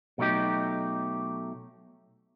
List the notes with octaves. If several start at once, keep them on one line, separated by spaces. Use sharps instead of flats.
B2 F#3 A3 D#4 G4